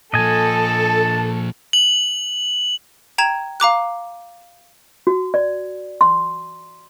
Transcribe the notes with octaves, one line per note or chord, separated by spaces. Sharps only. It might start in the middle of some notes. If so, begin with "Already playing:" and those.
A#2 F3 A4 D#5 G#5 A5
F#7
G5 A#5 G#6 E7
F5 A#5 D6 F#6
F#4
D5
C6